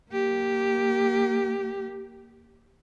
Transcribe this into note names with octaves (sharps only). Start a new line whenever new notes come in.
A#3 G4